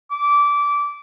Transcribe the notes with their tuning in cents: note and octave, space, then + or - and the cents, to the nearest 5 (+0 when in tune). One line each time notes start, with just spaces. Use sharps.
D6 -20